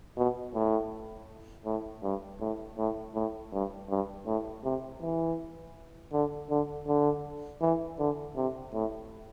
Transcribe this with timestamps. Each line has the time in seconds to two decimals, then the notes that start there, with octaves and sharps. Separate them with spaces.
0.17 B2
0.54 A2
1.65 A2
2.03 G2
2.40 A2
2.78 A2
3.14 A2
3.52 G2
3.89 G2
4.26 A2
4.63 C3
5.01 E3
6.13 D3
6.50 D3
6.87 D3
7.61 E3
7.99 D3
8.36 C3
8.73 A2